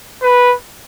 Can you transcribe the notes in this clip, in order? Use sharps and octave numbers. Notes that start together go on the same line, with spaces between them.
B4